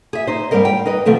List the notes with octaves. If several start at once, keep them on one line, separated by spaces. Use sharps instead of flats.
G#4 E5
D#4 C5
G#2 G3 C4 D#4 A#4 D#5
G5
D#4 B4 D#5
B2 D#3 F3 A3 C4 A4